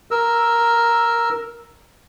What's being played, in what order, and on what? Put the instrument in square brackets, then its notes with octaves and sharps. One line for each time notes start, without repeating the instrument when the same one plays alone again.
[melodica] A#4 E6